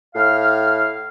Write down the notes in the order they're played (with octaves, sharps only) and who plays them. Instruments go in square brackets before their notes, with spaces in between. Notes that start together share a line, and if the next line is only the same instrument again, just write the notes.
[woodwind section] A2 F5 F6